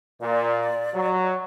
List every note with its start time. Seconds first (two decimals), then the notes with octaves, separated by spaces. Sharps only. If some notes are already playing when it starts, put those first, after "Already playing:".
0.21 A#2 D5
0.94 F#3